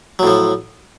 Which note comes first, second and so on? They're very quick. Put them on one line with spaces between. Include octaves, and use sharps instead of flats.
F#3 A2 F3